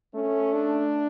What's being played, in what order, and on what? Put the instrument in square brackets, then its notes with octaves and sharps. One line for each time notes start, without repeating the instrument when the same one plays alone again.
[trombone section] A3 [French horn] C#4
[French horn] D4